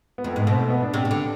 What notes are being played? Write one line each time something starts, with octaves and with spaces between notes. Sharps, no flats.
B3
F2 A3
B3
G#2
A3
B2 C4
A3
B3
D4
C3
C3
D3